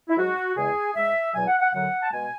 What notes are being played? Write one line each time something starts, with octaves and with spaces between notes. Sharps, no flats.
E4
G#2 F#3 F#4
E2 C#3 G#3 G#4
G#2 G#3 E5
E2 B2 F#3 G#5
F#5
F#5
F#2 D3 F#3 F#5
A5
B2 G#3 G#5